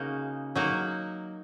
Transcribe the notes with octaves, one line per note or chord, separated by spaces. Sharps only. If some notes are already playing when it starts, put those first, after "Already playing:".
Already playing: C#3 A#3 D#4 F#4
F#3 A#3 D#4 F#4